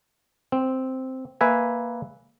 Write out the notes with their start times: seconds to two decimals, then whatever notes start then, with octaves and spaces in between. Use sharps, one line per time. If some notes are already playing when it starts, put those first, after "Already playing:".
0.52 C4
1.41 A#3 B4 E5 G#5